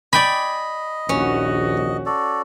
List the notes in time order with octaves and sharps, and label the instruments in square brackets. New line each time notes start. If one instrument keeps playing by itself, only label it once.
[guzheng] D5 G5 G#5 [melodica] D#5 [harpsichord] B5
[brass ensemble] A#1 D#2 F#4 [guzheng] C#4
[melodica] F#4 A4 D5